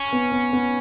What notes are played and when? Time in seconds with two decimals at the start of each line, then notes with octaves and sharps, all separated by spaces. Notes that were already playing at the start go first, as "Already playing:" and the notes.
Already playing: C#4
0.13 B3
0.32 B3
0.53 B3